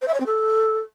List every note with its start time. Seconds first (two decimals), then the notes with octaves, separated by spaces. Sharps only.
0.02 C5
0.08 E5
0.14 C#5
0.20 C4
0.26 A4